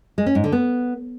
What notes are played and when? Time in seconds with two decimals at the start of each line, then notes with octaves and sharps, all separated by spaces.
0.18 G#3
0.26 C#4
0.35 G#2
0.44 D3
0.52 B3